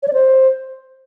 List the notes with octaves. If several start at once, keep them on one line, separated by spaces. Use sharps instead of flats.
C#5
D5
C5